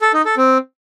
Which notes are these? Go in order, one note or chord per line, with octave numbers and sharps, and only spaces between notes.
A4
D#4
A4
C4